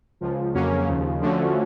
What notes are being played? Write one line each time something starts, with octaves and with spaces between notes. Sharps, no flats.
C#2 C#3 F3
F2 C#3 F#3 A#3 C#4
D#2 C#3 F3
D3 F3 A3 C#4 F#4